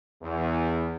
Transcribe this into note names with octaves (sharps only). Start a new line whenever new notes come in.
E2